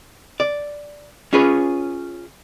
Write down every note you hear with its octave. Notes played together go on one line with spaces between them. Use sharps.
D5
C#4 F4 G#4 B4 C#5